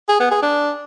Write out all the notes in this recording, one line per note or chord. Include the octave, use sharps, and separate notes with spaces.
G#4
B3
G#4
D4